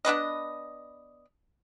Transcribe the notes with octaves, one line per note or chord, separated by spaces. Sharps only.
B3 D4 B4 D#5